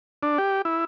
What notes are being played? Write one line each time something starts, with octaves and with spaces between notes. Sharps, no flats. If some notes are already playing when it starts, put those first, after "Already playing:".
D4
G4
E4